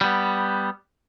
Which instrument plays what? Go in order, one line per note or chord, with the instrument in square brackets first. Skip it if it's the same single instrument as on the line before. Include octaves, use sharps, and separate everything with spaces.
[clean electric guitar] G3 B3